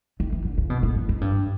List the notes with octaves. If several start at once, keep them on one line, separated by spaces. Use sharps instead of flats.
D#3
E3
D3
C#3
B2
A#2
A2
G#2
G2